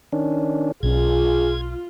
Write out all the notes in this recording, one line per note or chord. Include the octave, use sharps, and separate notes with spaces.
D#3 C#4 D4
B1 C#4 F4 G#4 G#6